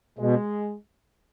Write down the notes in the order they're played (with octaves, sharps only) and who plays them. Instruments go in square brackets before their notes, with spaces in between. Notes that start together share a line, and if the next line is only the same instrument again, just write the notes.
[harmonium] B2 [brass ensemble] G#3